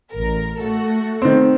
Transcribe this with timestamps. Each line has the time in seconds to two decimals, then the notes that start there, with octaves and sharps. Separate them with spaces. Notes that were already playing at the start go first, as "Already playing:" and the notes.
0.12 A1 A#4
0.61 A3 F#4 A4
1.22 D#3 C4